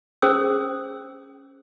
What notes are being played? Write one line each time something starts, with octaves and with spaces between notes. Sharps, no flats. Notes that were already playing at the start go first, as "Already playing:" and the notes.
C#4 G#4 C5 G5 D#6 E6